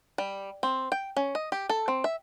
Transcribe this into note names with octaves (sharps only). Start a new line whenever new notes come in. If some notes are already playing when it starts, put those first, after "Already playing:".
G3
C4
G5
C#4
D#5
G4
A4
C4
E5